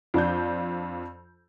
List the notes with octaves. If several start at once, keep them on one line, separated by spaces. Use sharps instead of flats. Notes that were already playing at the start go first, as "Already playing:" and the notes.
F2 D4 G6